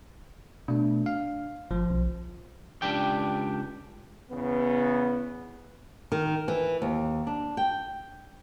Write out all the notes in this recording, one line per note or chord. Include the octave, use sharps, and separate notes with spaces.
B2 A3 D4
F5
G1 F3
B1
C#2 D4 G4 G5
E2 C#3 B3
D#3
E3
D#2
D4
G5